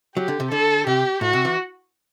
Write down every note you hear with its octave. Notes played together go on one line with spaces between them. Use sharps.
F#3 G4
D3
C3
D3 A4
C3 G4
A2 F#4
C3
E3